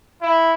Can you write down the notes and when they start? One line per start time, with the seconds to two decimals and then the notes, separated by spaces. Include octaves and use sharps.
0.22 E4